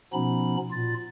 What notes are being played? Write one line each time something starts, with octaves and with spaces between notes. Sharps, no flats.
B2 F3 B3 C#4 D#4 B5
A#2 F4 A6